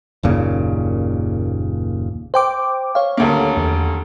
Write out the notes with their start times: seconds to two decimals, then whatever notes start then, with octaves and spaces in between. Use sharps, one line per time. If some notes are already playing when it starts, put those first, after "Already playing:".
0.23 F#1 D#2 A#2 C#3
2.34 C5 G5 D6
2.95 C#5 F5
3.17 D#1 D2 A#3
3.57 E2